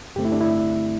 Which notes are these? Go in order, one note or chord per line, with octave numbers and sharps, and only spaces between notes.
G2 D3 A3 C4 G4
E4
D4
E4